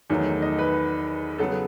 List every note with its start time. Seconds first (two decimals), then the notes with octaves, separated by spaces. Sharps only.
0.10 E2 D#3 F#3 A3
0.42 D#5
0.59 B4
1.39 C#3 F#3 B3 A4